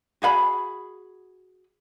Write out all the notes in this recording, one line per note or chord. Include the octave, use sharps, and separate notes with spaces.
F#4 G#4 F5 B5